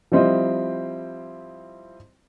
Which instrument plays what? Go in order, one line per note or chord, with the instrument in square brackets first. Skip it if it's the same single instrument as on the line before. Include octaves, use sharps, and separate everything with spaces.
[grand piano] F3 G3 C4 E4 C5 D#5